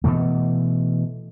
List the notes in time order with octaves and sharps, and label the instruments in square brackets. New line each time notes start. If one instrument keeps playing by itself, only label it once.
[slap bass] B2 E3 A3